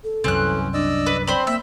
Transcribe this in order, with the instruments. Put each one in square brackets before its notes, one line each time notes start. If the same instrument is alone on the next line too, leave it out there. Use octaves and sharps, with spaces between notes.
[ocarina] A4
[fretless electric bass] C2 F#2 [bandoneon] E3 C#4 [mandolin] C4 F#6
[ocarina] D4 [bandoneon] D5 D#5 E6
[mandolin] B4
[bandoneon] C4 [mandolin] C5 B5 [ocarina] D5
[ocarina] A#3 [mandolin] E5